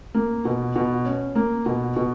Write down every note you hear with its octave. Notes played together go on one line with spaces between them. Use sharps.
A#3
B2
B2
C#4
A#3
B2
B2